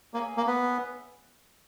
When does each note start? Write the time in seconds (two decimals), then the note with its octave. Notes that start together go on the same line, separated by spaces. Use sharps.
0.14 A#3 G#4 C#5 E5 G#5
0.37 A#3
0.47 B3